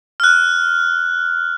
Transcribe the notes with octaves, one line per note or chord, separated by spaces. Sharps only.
F6 F#6